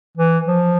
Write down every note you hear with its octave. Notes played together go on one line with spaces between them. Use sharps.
E3
F3